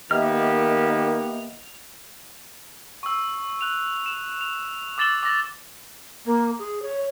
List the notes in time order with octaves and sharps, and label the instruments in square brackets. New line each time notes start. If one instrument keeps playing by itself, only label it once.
[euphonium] D#3 [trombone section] A#3 B3 G4 [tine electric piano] D#5 E5 [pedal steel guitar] F6
[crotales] C#6 E6
F#6 F7
E7
F7
D6 E6 A6 E7 F#7 G7
D6 E6 A#6 F#7
[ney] A#3
G#4
C#5